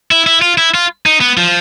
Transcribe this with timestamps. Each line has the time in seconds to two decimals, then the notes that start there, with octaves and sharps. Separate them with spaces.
0.11 E4
0.26 E4
0.42 F4
0.58 E4
0.74 F4
1.06 D#4
1.21 B3
1.37 F3